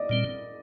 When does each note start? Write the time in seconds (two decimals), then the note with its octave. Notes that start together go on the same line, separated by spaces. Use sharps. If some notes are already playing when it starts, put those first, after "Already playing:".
Already playing: D5 D#5
0.09 A#2 G3 C4